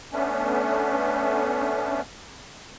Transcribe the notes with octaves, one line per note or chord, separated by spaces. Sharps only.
A3 B3 C#4 D4